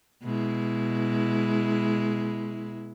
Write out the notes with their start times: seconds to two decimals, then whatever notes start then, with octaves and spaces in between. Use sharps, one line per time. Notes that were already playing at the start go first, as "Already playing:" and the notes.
0.23 B2 G#3 E4